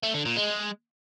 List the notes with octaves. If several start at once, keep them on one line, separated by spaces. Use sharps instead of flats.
A3
D3
A#2
G#3